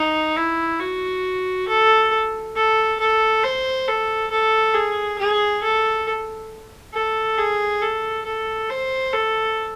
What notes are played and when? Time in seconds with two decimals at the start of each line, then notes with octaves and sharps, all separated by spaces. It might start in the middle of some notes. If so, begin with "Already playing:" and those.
Already playing: D#4
0.37 E4
0.80 F#4
1.68 A4
2.56 A4
3.00 A4
3.44 C5
3.88 A4
4.31 A4
4.74 G#4
5.19 G#4
5.63 A4
6.94 A4
7.38 G#4
7.81 A4
8.25 A4
8.69 C5
9.13 A4